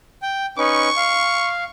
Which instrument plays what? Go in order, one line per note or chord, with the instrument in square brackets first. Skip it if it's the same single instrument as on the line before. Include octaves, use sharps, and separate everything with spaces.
[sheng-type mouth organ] G5
[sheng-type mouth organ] C#4 D#4 B4 [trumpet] C#6
[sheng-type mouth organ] F5